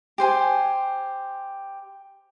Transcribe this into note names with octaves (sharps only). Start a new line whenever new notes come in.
G4 C5 G#5